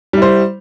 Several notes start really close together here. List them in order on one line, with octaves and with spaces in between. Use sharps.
G3 E4 C5